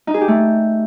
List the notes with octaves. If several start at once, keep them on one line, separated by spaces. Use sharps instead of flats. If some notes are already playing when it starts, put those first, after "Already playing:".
D#4
G#4
G4
A3